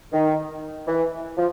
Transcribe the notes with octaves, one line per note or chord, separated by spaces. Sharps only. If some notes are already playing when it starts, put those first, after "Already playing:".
D#3
E3
F3